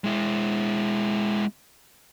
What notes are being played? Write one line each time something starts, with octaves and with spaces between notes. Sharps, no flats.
G#3 E4